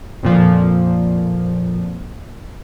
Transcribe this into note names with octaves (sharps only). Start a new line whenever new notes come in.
F2 A#2 F3